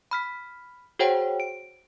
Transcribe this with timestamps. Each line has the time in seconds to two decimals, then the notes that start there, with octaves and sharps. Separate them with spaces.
0.11 B5 F6 B6
0.99 F#4 G#4 C5 C#5 F#5 G5
1.40 D7